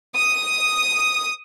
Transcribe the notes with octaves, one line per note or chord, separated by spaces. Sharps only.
D#6